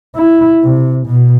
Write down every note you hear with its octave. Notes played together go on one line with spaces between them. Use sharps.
E4
C3
B2